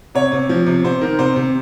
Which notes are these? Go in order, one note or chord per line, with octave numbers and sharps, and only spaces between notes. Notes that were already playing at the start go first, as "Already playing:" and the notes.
C3 C#5
C3
F3
C3
C3 C5
D#3 A#4
C3 C5
C3